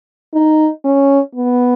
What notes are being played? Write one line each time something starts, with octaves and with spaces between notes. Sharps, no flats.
D#4
C#4
B3